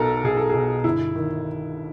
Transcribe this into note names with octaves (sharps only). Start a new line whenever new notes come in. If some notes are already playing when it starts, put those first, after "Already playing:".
Already playing: B1 B2 A4 A#4
B1 G#4
A4
B2 G#4
G1 E4
D#3